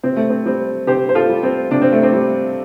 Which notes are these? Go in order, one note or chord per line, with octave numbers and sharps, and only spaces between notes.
C3 C4
A3
C4
G3 C4
C3 G4 C5
C5
F4 A4
G3
C4
C3 D4
C4
A3
C4
G3